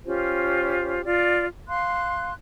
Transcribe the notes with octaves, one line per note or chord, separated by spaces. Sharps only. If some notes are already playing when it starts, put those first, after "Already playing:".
C#4 F4 G4 C5
F4 D5
F5 C6 F#6